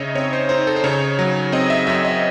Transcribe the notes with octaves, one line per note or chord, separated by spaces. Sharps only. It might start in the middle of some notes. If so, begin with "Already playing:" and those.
Already playing: C#3 D#4 C#5 D#5 E5
C4 C#5
C5
D#4 C5
A4
C5
C#3 C#5
F#3
C4 D#5
E5
F#2 E5
D#5